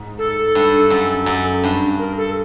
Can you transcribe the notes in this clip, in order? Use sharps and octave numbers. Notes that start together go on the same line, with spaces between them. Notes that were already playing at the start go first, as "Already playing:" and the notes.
Already playing: G#2
A4
G2
F#2
F#2
G2
A#4
A4